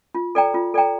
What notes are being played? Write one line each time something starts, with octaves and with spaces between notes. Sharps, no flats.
F4
A4 D5 G5 A#5
F4
A4 D5 G5 A#5